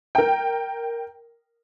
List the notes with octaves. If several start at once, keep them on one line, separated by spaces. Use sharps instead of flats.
A#4 G5